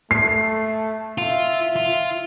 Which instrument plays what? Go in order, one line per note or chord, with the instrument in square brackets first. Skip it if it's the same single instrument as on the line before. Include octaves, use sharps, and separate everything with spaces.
[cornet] A3 [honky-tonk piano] C7
[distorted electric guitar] F4 [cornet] E5
[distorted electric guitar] F4